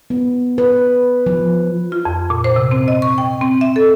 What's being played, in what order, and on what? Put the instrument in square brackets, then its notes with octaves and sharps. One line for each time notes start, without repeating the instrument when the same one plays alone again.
[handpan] B3
B4
F3
[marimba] F4
F2
A#2
C5
C3
C4
D#5
C#6
G5
C4
E5
A4